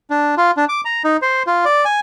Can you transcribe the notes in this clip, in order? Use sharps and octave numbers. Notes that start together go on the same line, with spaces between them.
D4
F4
D4
D6
A#5
D#4
C5
F4
D5
G#5